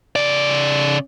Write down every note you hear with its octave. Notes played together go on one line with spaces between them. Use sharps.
C#3 D5